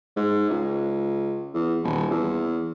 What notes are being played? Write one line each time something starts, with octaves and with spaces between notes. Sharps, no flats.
G#2
C#2
E2
D#1
E2